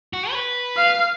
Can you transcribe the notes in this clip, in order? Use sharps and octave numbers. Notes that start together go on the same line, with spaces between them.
F#4
C#5
B4
F5